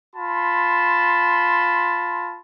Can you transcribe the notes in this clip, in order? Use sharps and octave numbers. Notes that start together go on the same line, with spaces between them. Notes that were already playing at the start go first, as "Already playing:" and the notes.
F4 A5 B5 C6